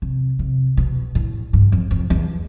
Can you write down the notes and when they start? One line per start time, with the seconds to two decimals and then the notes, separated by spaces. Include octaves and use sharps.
0.02 C3
0.39 C3
0.77 B2
1.15 A2
1.53 G2
1.72 F2
1.91 F2
2.10 E2